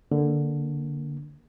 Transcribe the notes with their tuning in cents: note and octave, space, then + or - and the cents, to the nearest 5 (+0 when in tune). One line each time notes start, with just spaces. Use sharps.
D3 +0 A#3 +0